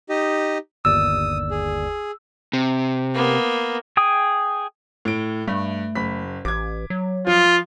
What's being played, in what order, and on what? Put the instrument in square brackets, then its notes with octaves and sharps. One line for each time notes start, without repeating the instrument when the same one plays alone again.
[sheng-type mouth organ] D#4 G4 D#5
[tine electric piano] G1 D#2 D5 [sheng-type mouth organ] D#6 [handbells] E6
[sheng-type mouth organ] G#4
[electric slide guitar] C3
[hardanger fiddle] A#3 B3
[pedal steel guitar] G#4 G5 D#6
[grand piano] A2 D7
[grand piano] G2 [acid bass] A3
[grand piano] F#1 B5 B6
[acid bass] A1 [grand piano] D6 G#6
[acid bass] F#3
[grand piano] F3 [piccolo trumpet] F4